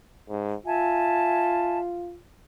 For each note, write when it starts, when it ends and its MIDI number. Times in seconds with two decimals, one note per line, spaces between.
0.29 0.55 44
0.66 2.18 65
0.66 1.79 76
0.66 1.79 80
0.66 1.79 81